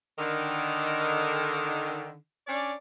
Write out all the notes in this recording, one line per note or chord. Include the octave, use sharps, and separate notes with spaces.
D3 D#3
C#4 D4 D5